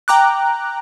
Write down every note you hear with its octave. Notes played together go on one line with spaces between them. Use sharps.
G5 A#5 D6 F#6